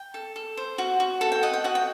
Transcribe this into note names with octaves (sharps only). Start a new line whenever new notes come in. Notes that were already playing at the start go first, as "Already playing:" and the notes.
Already playing: G5
A4
A4
C5
F#4 F#5
F#4
A4 F#5
G5
D#5 F#5
G5
F#4 F#5
G5